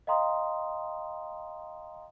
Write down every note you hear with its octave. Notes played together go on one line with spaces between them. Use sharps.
D#5 F5 G5 A#5 C6 D#6